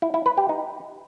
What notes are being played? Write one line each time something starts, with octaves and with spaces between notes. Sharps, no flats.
E4
E4
B4
G4
D#4